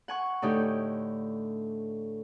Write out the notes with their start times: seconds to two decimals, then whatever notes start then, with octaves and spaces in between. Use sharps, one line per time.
0.08 F#5 G#5 C#6
0.42 A2 D3 D#4 G4